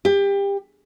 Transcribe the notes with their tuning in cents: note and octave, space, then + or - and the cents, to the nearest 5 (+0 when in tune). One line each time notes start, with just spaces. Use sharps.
G4 +25